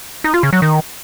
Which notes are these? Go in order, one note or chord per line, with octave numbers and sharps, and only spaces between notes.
D#4
F4
C#3
F#3
D#3